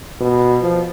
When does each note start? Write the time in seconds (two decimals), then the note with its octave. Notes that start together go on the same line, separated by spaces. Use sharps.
0.21 B2
0.62 F3